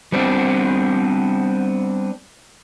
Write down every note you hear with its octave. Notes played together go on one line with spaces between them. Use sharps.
G3 B3 C4 D4